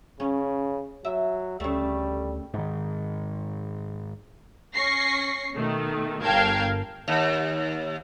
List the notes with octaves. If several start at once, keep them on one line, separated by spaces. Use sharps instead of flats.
C#3 C#4
F#3 E5
D2 C#3 G3 A3
G#2 D#3
C#4 C#6 A#6 C7
B2 D#3 A3
G1 A#4 F5 G5 A5 G#6
D#2